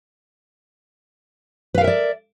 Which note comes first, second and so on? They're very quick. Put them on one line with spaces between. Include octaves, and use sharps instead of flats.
B4 F5 A#4 E5 D5